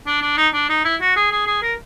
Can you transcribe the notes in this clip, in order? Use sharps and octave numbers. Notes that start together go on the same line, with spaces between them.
D4
D4
D#4
D4
D#4
E4
F#4
G#4
G#4
G#4
A#4